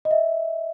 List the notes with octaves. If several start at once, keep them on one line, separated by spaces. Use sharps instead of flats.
D#5
E5